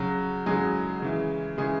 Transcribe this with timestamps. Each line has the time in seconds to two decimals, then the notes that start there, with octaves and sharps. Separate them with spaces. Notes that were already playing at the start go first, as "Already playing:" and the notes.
Already playing: C#3 F#3 F#4
0.46 C#3 F#3 G#3 G#4
1.02 C#3 E3
1.58 C#3 E3 G#3 G#4